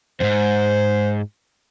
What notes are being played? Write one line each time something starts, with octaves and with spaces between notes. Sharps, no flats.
F2 G#2 C5